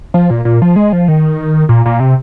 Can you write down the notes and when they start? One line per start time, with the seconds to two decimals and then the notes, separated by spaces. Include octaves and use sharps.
0.14 F3
0.30 A#2
0.45 A#2
0.62 F3
0.76 G#3
0.93 F3
1.08 D#3
1.69 A#2
1.86 A#2
2.00 C3